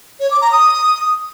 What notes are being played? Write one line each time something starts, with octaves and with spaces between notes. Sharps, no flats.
C#5
D6
A#5
D#6